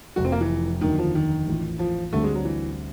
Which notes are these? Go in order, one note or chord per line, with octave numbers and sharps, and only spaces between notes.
F1 F2 C3 F#4
C4
A#3
E3
D#2 D3 D#3 F#3 A#3 D#4
F3
D#3
A1 A2 F3
F3
D2 D3 G3 A3 C4
G#3
F#3
E3